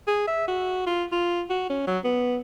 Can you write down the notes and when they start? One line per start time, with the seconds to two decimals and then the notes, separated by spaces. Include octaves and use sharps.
0.08 G#4
0.27 E5
0.48 F#4
0.86 F4
1.12 F4
1.50 F#4
1.70 C#4
1.87 F#3
2.04 B3